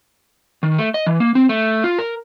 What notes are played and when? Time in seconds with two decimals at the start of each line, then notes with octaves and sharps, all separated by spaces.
0.63 D#3
0.78 A3
0.94 D#5
1.06 E3
1.20 A#3
1.35 C4
1.49 A3
1.84 F4
1.99 A#4